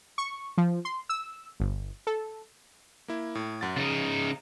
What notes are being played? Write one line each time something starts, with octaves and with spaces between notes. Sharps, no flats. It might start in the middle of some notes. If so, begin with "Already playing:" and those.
C#6
F3
C6
E6
G1
A4
A#3 E4
A2
F#2 F#5 A6
C#3 D#4 A6